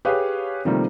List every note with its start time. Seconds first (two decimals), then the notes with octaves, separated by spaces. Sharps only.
0.05 G4 G#4 B4 C#5 F5
0.65 C3 D#3 F3 G3 A3 A#3